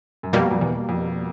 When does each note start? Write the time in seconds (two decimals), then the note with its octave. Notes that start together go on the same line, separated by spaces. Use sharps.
0.23 F#2
0.33 F2 B2 G3 A#3
0.51 F2
0.61 E2
0.89 F2